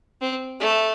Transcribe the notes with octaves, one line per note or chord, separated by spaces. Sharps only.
C4
A3